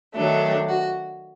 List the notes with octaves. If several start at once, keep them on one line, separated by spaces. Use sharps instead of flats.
D#3 F#3 A3 D4
F#4